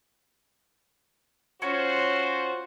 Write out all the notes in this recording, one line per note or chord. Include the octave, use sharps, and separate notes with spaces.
C#4 F4 F#4 C5